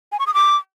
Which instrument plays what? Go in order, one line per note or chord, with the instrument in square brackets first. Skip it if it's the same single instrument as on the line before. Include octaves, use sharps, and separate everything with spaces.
[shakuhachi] G#5
C#6
D#6
D6